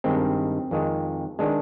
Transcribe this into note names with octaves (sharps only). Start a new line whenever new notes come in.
G2 D#3 G#3 C4
F2 D#3 G#3
D#3 G#3 D4